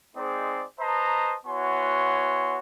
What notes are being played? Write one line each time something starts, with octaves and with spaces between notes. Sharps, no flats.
G#3 C4 D#4 G#4 C5 D5
B4 C5 D#5 A5 A#5
B3 E4 F#4 C#5 G#5 C6